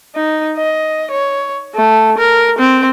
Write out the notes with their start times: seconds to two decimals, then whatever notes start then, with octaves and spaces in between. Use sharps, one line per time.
0.15 D#4
0.57 D#5
1.11 C#5
1.75 A3
2.18 A#4
2.59 C4